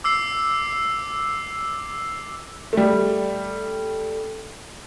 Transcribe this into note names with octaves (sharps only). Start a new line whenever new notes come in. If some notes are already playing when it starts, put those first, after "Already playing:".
D6 E6 C7
G3 A3